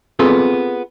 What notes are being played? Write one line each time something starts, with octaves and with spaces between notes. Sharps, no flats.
B3 C4 F4 G#4 A4